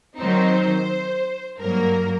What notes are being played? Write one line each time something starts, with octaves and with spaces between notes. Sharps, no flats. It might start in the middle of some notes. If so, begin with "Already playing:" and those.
D#3 F#3 C4 D#4 C5
G2 F#3 A#3 A#4